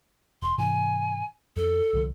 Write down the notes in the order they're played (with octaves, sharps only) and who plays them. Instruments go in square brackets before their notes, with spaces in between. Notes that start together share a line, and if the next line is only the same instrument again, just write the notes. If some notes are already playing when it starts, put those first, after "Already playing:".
[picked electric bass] E1 [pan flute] C6
[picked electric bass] G#2 C3 E3 [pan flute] G#5
[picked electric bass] F2 [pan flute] A4
[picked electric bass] C2 D3 F3